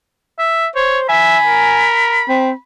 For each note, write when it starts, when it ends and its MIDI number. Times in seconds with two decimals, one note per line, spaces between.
0.39 0.67 76
0.76 1.06 72
0.76 0.99 73
1.09 1.38 76
1.09 1.87 80
1.09 2.60 83
1.46 2.25 70
2.29 2.51 60